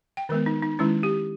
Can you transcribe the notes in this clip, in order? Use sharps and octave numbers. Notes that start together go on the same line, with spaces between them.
G5
D#3 G#3 B3 A#4
D#4
D#4
D#3 G#3 C#4 E4
G4